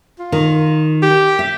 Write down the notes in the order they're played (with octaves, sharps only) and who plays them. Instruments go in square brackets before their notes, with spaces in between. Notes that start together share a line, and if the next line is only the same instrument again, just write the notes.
[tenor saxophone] F4
[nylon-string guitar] D#3
[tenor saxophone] G4
[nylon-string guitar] E5